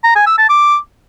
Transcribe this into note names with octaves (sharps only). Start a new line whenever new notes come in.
A#5
G#5
E6
A5
D6